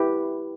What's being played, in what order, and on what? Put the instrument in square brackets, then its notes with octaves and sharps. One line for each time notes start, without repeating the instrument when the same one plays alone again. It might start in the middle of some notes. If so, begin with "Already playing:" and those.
Already playing: [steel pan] E4 G4 B4